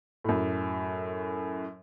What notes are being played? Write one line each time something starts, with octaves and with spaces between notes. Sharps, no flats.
F#2 A2